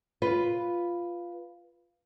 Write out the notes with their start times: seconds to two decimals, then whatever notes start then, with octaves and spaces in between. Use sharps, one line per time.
0.22 F4 B4